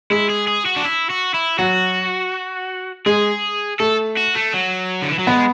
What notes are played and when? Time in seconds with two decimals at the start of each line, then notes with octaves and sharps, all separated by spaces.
0.10 G#3 E4
0.29 G#4
0.48 G#4
0.66 F#4
0.77 D4
0.85 E4
1.10 F#4
1.34 E4
1.58 F#3 F#4
3.06 G#3 G#4
3.80 A3 A4
4.17 F#4
4.35 A3
4.54 F#3
5.02 D3
5.11 E3
5.19 F#3
5.27 G#3 B3